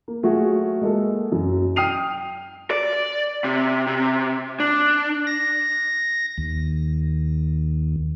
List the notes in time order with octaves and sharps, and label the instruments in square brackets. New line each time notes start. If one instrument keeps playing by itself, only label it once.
[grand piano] A#3
F#3 A3 F4 F#4 G#4
G#3 A#3 A4
F#2
G5 D#6 F6 C7 D#7 F7
[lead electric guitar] D5
C3
C3
D4
[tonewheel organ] A#6
D#2